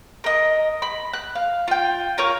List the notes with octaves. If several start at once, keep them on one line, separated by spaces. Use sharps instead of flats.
A#4 D#5
B5
F#6
F5
F4 G5
F4 A#4 C#5 F6